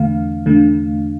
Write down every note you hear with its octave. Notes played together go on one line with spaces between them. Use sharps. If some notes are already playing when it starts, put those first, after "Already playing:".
Already playing: E2 D3 A3 F5
E2 D3 A3